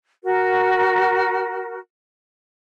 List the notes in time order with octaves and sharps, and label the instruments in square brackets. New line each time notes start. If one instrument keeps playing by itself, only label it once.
[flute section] F#4 A#4